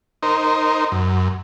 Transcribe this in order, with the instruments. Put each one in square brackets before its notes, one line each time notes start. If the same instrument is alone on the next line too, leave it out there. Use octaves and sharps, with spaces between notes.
[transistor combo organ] D#4 A#4 C5
F#2